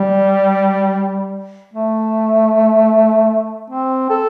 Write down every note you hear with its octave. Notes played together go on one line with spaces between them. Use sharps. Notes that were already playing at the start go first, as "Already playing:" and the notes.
Already playing: G3
A3
C4
A4